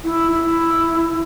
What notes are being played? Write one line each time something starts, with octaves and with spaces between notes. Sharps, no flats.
E4
E4